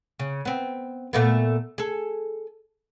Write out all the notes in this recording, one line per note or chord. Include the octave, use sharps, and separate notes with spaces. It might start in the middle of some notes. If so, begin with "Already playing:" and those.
C#3
B3 C4
A#2 A3 B3
G#4 A4